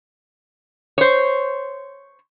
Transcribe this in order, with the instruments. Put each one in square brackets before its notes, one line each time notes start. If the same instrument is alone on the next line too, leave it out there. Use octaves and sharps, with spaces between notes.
[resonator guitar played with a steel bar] C5 C#5